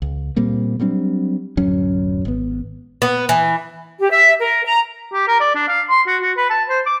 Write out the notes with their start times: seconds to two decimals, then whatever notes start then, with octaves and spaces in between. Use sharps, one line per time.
0.02 C#2
0.36 A#2 G3 A#3 C4
0.80 F#3 G3 C4 D4
1.57 D1 F#2 F#3 C#4
2.25 G#1 B3
3.02 B3
3.29 E3
4.00 G4
4.11 E5
4.39 A#4
4.64 A#5
5.13 G4
5.28 A#4
5.40 D5
5.55 D4
5.68 F5
5.90 C6
6.07 F#4
6.22 F#4
6.37 B4
6.50 A5
6.69 C5
6.86 D6